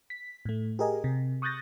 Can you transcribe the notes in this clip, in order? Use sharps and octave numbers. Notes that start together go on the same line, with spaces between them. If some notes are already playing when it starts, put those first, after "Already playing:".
B6
A2 A3
G4 G#4 A#4 D#5 G#5
C3
C#6 D#6 F#6 G6 A6 A#6